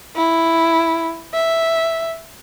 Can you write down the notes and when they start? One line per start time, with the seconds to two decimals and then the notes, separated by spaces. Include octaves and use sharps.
0.16 E4
1.34 E5